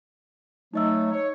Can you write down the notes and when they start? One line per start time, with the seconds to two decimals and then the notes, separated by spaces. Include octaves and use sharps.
0.74 F#3 A3 D#4 D#5 E6
1.12 C#5